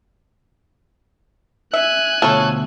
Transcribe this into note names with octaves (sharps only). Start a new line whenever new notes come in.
E5 G#5 F#6
D2 B2 F3 A4 C#5 E5